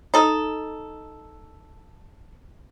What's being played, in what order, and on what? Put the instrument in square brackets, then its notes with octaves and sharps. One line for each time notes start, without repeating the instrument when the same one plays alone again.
[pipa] D#4 A4